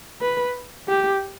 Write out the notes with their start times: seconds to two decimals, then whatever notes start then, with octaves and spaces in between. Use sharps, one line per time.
0.21 B4
0.88 G4